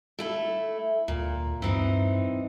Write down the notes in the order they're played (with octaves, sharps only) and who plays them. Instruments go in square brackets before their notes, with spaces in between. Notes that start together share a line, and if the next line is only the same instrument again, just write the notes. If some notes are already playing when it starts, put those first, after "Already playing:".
[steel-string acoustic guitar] A3 E4 A4
[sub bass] D2 [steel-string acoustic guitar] A#2
[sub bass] G2 [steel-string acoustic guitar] E3 C4 D#4